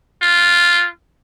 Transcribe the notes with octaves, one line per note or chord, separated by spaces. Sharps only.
F4